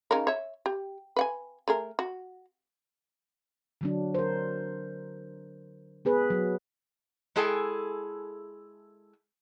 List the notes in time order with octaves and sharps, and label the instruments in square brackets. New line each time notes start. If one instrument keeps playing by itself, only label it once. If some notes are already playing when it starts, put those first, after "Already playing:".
[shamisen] C#3 D#4 A#4
C#5 E5
G4
B4 F#5 G#5
A3 G#4 A#4
F#4
[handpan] D3 F#3 D4
A#4 C5
B3 G#4 B4
F#3
[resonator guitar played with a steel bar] G#3 E4 G#4 A4 G5 G#5